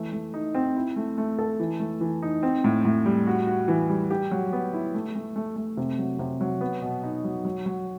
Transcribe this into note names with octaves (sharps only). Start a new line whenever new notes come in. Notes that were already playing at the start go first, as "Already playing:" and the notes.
Already playing: E3 A3
A3
D#4
C4
E4
A3
A3
A4
E3
A3
E3
D#4
C4
A2
A2
G3
F#4
F#4
E3
G3
G4
F#3
B3
E4
A3
A3
A3
A3
C3
F#3
C3
F#3
B3
B2
D#4
F#3
F#3
F#3